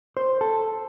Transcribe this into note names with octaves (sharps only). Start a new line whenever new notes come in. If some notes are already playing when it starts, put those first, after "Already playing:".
C5
A4